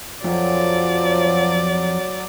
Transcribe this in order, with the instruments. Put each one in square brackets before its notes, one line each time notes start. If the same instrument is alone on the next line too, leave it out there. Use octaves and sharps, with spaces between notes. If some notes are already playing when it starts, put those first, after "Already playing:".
[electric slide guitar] F2 [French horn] F3 [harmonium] F#3 [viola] D5